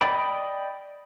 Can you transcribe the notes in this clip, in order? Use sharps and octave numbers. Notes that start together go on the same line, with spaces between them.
D5 D#5 G5 B5 D6